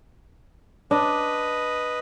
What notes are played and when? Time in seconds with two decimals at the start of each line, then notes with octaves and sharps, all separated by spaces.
0.91 D4 B4 D#5